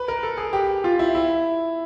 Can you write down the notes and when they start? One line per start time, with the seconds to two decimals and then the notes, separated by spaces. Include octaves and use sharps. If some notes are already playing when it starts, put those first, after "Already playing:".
Already playing: B4
0.08 A#4
0.23 A4
0.37 G#4
0.53 G4
0.84 F4
0.99 E4
1.15 E4